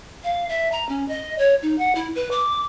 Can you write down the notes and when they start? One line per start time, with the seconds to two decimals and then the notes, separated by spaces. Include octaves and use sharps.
0.24 F5
0.49 E5
0.72 A#5
0.89 C#4
1.08 D#5
1.38 C#5
1.62 D#4
1.78 F#5
1.95 E4
2.15 B4
2.31 D6